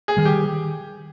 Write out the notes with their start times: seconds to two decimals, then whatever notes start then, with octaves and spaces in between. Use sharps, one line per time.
0.08 G#4
0.17 D#3 G3
0.25 G4